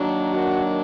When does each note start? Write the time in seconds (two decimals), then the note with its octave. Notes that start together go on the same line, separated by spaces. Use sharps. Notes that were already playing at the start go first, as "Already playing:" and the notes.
Already playing: D#3 F#3 A#3 D4
0.33 F#4